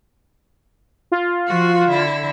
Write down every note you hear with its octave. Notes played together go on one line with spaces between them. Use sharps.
F4
F3 F#4
D3 E4